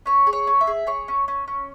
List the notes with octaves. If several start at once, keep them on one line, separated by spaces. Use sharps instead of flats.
C#4 C#5
G#4
C#5
C#4
E5
G#4
G#4 C#5
C#4
C#4
C#4